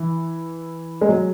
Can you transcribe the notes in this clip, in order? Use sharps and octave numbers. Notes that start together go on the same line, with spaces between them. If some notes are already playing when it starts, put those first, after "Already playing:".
Already playing: E3
G#3
F#3